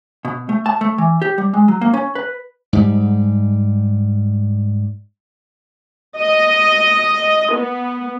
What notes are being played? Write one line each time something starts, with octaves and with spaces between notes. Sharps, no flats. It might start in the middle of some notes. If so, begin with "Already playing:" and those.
B2
A3
A5
A3
E3
G4
G3
G#3
F#3
A#3
C#4
B4
G#2 G3
D#5
B3